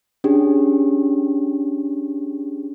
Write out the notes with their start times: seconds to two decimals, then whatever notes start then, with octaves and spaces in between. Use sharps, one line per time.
0.24 C#4 D4 G4 G#4